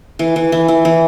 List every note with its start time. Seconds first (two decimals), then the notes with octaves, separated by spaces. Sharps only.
0.19 E3
0.36 E3
0.52 E3
0.68 E3
0.85 E3